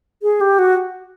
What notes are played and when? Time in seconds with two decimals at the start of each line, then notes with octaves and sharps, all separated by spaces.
0.23 G#4
0.41 G4
0.59 F#4